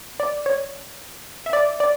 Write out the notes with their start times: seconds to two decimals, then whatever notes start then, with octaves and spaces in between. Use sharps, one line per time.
0.20 D5
0.46 C#5
1.46 E5
1.53 D5
1.80 D5